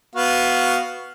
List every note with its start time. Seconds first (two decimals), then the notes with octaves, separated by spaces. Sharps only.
0.15 B3 F#4 F5